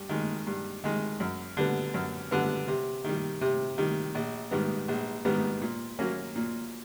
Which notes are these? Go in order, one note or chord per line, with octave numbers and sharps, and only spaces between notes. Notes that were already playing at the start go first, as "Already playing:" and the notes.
Already playing: G2
D#3 G#3
G2
D#3 G#3
F#2
D3 G3 B3
F#2
D3 G3 B3
C3
D#3 G3
C3
D#3 G3
A#1
G#2 D#3 G3 B3
A#1
G#2 D#3 G3 B3
A#2
F#3 A#3 C#4
A#2